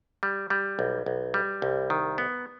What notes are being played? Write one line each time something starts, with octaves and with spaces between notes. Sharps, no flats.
G3
G3
B1
B1
G3
C2
D#3
B3